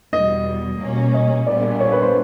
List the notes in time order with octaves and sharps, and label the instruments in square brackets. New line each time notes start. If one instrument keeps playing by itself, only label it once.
[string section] E2 B2 G3 [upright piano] D#5
[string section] B2 G3 A#3 C#4
[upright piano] D#5
[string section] A#1 A#2 G3 B3 [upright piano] D5
[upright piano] C#5
B4
C5